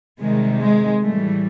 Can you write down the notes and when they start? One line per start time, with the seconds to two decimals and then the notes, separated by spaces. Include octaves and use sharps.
0.20 C3 D#3 G3 G#3
0.61 G#3
1.03 A2 E3 G3 A3